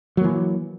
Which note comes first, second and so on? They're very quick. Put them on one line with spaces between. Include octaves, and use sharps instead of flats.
F#3 A#3 E3